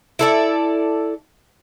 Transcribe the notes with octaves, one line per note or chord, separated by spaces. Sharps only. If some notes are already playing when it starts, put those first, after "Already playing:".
E4 A4 D5